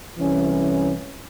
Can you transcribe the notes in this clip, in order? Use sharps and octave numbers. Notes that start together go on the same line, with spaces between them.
C2 E3 C#4